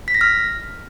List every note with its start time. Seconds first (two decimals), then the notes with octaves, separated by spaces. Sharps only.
0.08 B6
0.14 A#6
0.21 F6